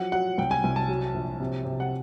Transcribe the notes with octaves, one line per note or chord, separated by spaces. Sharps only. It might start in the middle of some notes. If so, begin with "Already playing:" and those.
Already playing: F3 F#3 F#5
F#3 F#5
C2 G5
G#5
C2
A5
F#3
A#1
C3
C3
F#5